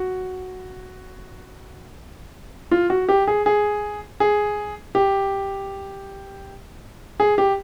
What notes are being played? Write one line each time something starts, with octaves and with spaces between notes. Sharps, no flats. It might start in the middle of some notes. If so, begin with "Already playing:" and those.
Already playing: F#4
F4
F#4
G4
G#4
G#4
G#4
G4
G#4
G4